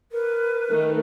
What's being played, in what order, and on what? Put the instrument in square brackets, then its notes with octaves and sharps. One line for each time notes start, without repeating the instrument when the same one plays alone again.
[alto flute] A#4 [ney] B4
[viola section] D#3 A3